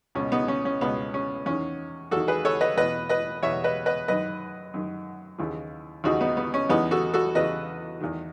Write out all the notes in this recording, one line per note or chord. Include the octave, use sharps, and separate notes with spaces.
C#2 B2 C#4
B3 D#4
C#4
C#4
C#2 B2 B3
C#4
E2 D#3 C#4
E2 D#3 F#4 A4
G#4 B4
A4 C#5
B4 D#5
E2 B2 B4 D#5
B4 D#5
E2 B2 C#5 E5
B4 D#5
B4 D#5
F#2 D#3 B4 D#5
F#2 D#3
D#2 C#3 E3
D#2 C#3 E3 D#4 F#4
B3 D#4
B3
C#4
E2 C#3 E3 B3 D#4
F#4 A4
F#4 A4
E2 C#3 E3 B4 D#5
E2 D#3